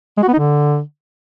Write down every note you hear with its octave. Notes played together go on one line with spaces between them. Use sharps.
G#3
F#4
B3
D#4
D3